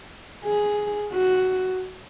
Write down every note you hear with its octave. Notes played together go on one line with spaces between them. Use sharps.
G#4
F#4